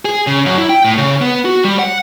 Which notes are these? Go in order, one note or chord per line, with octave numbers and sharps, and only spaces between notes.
G#4
C#3
F#2
E4
G5
A2
C#3
B3
F#4
G3
F#5